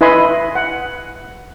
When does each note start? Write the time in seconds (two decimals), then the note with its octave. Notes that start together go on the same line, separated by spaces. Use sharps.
0.01 E4 B4 D#5 G#5 B5 C6
0.55 F#5